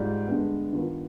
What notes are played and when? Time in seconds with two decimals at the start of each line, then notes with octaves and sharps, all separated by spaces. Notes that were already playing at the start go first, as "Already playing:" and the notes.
Already playing: G#2 G3 F4
0.27 G2 D3 G#3 B3
0.73 G2 D#3 B3 F4 B4